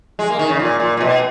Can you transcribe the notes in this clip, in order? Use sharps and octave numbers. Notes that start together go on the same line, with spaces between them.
G#3
A#3
D#3
C#3
A#2
A#2
A#2
B2